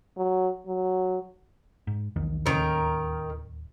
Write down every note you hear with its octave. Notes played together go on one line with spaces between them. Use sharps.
F#3
F#3
G#2
B1 E2 D#3
D1 D#2 D#3 C#4 A#4